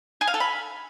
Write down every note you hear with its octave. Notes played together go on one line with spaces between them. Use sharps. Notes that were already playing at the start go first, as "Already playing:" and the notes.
G#4
F5
A4
B5